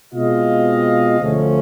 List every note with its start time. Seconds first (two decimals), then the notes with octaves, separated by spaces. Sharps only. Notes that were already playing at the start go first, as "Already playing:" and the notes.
0.14 B2 G#3 C4 F4 D#5 F5
1.20 D2 D3 F3 A3 C#4